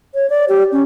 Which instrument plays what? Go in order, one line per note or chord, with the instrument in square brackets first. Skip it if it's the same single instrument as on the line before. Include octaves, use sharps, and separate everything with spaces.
[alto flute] C#5
D5
G4
C#4